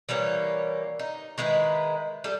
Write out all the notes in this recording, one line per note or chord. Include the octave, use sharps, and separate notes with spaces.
E3 G3 A#3 C#5
D#4
D#3 G#3 E4 B4
G3 A4